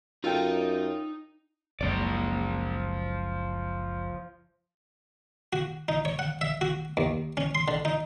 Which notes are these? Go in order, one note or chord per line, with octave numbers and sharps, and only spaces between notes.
F#2 D#4 F4 A4 G5
F#1 C#2 F3 D5
F#4
D#4
C#5
F#5
E5
F#4
D#2
C#4
C6
D3
D#4